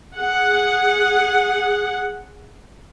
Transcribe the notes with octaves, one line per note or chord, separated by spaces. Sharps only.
G#4 F#5